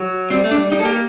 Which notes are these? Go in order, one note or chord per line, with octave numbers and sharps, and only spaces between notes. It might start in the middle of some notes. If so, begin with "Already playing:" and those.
Already playing: F#3
G3 C4
A3
D4
G3
G3 D#4
A#3 A4
G4
A#3